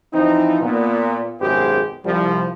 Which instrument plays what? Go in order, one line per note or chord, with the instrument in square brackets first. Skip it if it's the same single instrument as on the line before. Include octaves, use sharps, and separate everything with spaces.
[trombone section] E3 F3 C4 D#4
A#2 B3
G#1 F#2 B2 G4 G#4 C5
C2 F3 G3